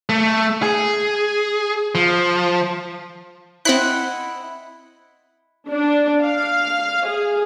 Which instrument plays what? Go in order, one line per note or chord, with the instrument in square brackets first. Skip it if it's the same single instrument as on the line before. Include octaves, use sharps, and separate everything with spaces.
[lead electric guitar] A3
G#4
F3
[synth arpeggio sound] C4 B5 F#6 [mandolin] E4 D#5 F#5
[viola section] D4
F5
G#4